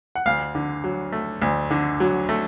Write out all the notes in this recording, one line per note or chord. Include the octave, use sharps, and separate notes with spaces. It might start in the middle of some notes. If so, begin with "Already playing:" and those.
F#5
D2 F5
D3
F#3
A3
D2
D3
F#3
A3